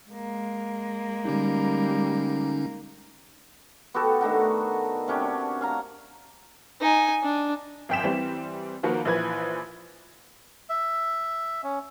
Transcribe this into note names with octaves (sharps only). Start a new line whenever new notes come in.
G#3 A#3
D3 G3 C#4 D#4
B3 F#4 G4 A4
D#3 A3 D4 F#4
C3 C#4 D4
C#4 F5 A#5
D#4 G#5
D4
G#1 F#2 G5 B6 E7
E3 G3 C4
D#3 F3 A#3 F#4 B4
A#1 E3 F3 B4 G#6
E5
C#4